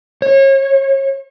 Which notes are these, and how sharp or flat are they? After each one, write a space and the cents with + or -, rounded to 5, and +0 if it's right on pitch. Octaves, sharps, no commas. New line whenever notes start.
C#5 -35